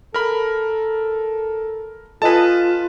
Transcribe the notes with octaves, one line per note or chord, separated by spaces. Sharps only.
A4 A#4 B5
F4 A4 B4 D#5 G#5 A5